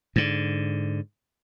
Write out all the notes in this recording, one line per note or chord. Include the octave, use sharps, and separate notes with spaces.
G#2 D3